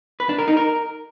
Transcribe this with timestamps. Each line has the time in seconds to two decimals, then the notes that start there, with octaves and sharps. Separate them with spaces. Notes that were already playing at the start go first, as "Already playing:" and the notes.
0.20 B4
0.29 D4
0.38 A#4
0.48 D#4
0.57 A#4